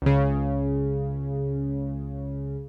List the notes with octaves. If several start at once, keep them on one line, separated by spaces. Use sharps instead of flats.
C#2 C#3